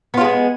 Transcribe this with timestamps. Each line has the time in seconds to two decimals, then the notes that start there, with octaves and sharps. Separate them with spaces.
0.14 B3
0.17 F4
0.21 G#3
0.24 G#4